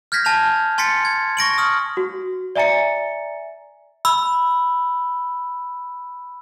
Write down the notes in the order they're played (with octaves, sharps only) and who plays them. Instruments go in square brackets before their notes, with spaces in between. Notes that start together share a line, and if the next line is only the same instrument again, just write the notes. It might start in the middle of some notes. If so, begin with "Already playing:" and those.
[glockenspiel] F6 G6 G#6 A#6 B6
G#5 A5 G6 A#6 F7
G#5 C6 A6 B6 C#7
G#6
C#6 A#6 D7 F#7
D#6 F6
[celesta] F#4
D5 E5 G#5 A#5 A6 C#7
[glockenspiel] B5 E6